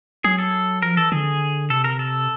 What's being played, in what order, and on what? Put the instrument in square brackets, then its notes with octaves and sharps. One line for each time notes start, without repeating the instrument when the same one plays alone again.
[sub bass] F#3 [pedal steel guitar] G#4
[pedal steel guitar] A4
[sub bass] F3 [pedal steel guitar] A#4
[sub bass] E3 [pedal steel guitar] A4
[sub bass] D3 [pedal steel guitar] G#4
[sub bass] C3 [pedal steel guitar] A4
[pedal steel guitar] A#4
A4